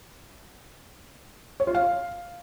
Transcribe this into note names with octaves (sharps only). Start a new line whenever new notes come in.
C#5
F4
F5